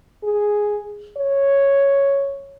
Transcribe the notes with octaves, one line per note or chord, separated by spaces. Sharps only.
G#4
C#5